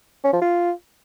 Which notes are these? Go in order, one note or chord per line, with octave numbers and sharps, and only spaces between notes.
C#4
F3
F4